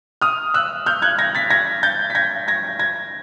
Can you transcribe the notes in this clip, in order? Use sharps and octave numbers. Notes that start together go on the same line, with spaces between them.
D#6 F6
E6 F#6
F6 G6
F#6 G#6
G#6 A#6
A6 B6
G#6 A#6
G6 A6
B6
G#6 A#6
G#6 A#6
G#6 A#6